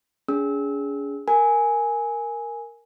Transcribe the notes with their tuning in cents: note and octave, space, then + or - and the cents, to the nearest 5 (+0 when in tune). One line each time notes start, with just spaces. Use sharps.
C#4 +45 G#4 +0 E6 -25
A#4 +0 G#5 +0